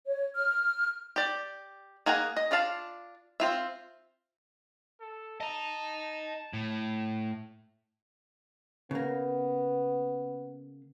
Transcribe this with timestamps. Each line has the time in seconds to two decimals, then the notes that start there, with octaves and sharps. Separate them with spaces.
0.07 C#5
0.35 F6
1.16 G4 D5
2.06 A#3 G#4 F#5 G#5 A#5
2.37 D#5
2.51 D4 F4 D5 F5 A5
3.40 C4 F4 E5
5.01 A4
5.40 D#5 A5 A#5
6.53 A2
8.91 C#3 A#3 B3